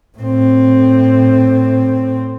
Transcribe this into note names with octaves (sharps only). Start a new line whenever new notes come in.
A2 C4